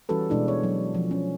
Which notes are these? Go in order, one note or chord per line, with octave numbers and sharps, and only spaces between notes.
E3 G3 C#4 F#4 A4 B4
B2 G#3 D4 E4
C#5
F#3
F3
C#4